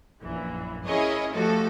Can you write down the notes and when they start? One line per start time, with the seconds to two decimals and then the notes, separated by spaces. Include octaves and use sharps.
0.22 A#1 F#2 A#2 E3
0.86 C#4 E4 G#4 A#4 C#5 D#5
1.33 F3 A3 F#4 G4 A4